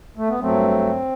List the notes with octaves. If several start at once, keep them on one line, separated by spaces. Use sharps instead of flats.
A3
B3
G2 F#3 A3 C4